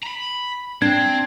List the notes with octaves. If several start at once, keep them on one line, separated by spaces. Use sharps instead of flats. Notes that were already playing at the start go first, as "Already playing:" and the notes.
A#5 B5
C4 D4 G#6